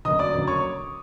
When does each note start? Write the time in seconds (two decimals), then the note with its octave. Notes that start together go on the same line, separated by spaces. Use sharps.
0.05 D2 C#3 F#3 A#3 D#5 D#6
0.19 D5 D6
0.33 D2 C#3 F#3 A#3
0.47 C#5 C#6